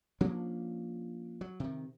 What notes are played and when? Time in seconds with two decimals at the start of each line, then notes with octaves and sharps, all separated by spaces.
0.21 F3 A#3 C#4 D4
1.41 F#3
1.60 C3 D#3